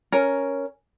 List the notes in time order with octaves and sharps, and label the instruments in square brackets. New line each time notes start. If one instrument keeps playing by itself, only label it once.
[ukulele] C#4 A#4